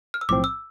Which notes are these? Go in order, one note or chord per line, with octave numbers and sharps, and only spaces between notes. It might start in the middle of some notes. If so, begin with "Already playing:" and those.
F6
E6
B1 A2 F3 C4 D6
E6